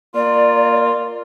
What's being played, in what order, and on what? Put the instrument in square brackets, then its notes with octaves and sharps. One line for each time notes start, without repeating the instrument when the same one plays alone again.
[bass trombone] A#3 [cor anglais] F4 [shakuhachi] D5